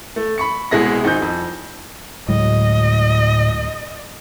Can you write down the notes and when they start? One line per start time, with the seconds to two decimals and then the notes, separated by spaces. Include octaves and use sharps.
0.16 A3
0.38 B5 C#6 C#7
0.71 C2 B2 G#3 E4 A#6
1.04 G#1 D#4 G#5 G6
1.22 F2
2.29 D2 A2 F#3 G#3 D#5